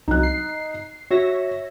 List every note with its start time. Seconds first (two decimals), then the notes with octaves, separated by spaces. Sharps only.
0.08 C2 F#3 D#4 F#6
0.23 C7
1.11 F#4 C#5 E5 A#6